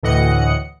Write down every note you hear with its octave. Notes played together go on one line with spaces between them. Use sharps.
D2 A2 E3 D#5 F#5 C#7